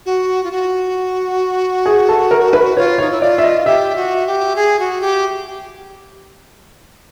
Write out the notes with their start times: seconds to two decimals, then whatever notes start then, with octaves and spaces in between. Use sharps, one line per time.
0.06 F#4
0.44 F4
0.52 F#4
1.86 G#4
2.09 A4
2.31 A#4
2.53 B4
2.76 F4 C#5
2.98 D#4 C#5
3.11 E4
3.22 F4 D5
3.38 E5
3.44 D#5
3.66 G4 E5
3.96 F#4
4.27 G4
4.56 G#4
4.79 F#4
5.01 G4